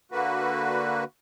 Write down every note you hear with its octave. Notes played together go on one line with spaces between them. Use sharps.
D3 A#3 F#4 B4